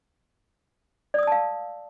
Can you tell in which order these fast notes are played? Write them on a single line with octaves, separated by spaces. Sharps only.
D5 D#6 E6 A5 F5